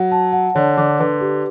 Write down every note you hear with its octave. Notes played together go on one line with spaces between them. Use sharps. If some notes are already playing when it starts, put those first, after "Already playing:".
Already playing: F#3 F#5
A5
F#5
D3 C#5
D3 D6
D3 B4
G4